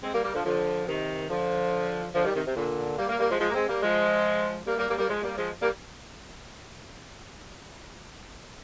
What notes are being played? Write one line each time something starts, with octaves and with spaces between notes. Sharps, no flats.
G#3 C4
G3 A#3
G3 A#3
D3 F3
D3 F3
C3 D#3
D3 F3
D3 F3
D#3 G3
C3 D#3
C3
A#2 D3
G3 A#3
G3 A#3
G3 A#3
F3 G#3
F3 G#3
A#3
G#3 C4
G3 A#3
F3 G#3
G3 A#3
G3 A#3
G3 A#3
G3 A#3
F3 G#3
G3 A#3
F3 G#3
G3 A#3